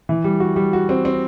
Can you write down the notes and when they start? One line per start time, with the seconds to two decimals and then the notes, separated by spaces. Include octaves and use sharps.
0.09 E3
0.24 G3
0.40 F#4
0.56 G3
0.73 F#4
0.89 C4
1.05 C4